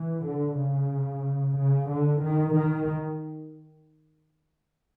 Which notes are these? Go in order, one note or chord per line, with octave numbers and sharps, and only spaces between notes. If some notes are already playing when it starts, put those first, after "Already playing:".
Already playing: E3
D3
C#3
C#3
D3
D#3
D#3